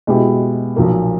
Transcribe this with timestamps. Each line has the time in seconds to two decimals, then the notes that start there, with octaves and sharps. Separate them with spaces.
0.07 B2 G#3 B3 E4 G4
0.76 B1 A#2 F3 A#3